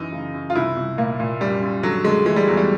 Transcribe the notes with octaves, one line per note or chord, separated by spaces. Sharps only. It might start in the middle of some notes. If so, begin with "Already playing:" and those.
Already playing: F#2 E3 D#4
C#3
F#2
F4
C2 E4
C2
A#2 A#3
A#2
F#2 G3
F#2
D3 F#3
D3 G#3
E3 G#3
G3
E2 F#3
G3